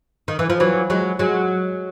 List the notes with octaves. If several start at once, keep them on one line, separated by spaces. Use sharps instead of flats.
D#3
E3
F3
E3 F#3
F#3 G#3
F#3 G#3